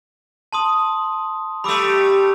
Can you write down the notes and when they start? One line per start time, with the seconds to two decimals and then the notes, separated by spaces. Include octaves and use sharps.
0.53 A5 C6 D#6
1.64 G3 A3 B5 D6 E6